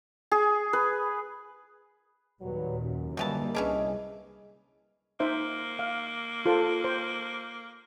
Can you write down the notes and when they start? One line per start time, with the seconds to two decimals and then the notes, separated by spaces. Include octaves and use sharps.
0.32 G#4
0.73 B4
2.41 D#2 A#2 F#3 G3 B4
2.80 F#2
3.17 B2 D3 E3 G3 A#3 A5
3.55 C2 E3 C#4 D4 G#4 D#5
5.20 A#3 D#4 C5 E5
5.79 F5
6.46 F4 A4 C5
6.84 C5